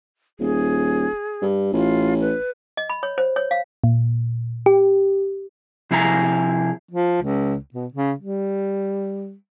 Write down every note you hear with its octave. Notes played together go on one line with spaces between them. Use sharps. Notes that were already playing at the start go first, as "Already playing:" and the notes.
D#1 G#4
G2
A1 F4
B4
D#5
B5
C#5
C5
C#5
F5
A#2
G4
C3 F3 E4 G#4 C5 A#5
F3
C#2
B2
C#3
G3